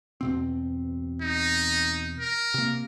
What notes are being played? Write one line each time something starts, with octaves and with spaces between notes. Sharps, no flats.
E2 B2 C4
D#4
A#4
C3 A#3